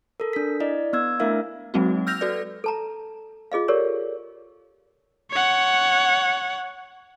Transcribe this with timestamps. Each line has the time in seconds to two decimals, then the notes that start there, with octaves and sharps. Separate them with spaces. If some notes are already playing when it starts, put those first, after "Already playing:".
0.20 A4 A#4
0.33 D4 B6
0.60 E4 D5 D#5
0.93 B3 E6 G#6
1.20 A3 D4 E4 A#4 E5 F5
1.74 F#3 G#3 A#3 C4 D#4 F#4
2.07 E6 F6 G6 A#6 F7
2.21 F#4 A4 B4 D5
2.64 A4 A5 A#5
3.52 F4 G#4 D#5 F5
3.68 G4 A4 A#4 C#5 D5
5.31 C#5 F#5